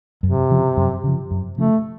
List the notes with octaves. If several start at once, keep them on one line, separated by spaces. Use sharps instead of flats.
F#2 C3
C#3 F3
F#2
C#3 F3
F#2
C#3 F3 A3